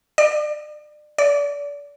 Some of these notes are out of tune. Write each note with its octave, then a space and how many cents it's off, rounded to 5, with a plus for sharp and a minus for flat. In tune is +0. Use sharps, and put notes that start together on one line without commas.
D5 +30
D5 -35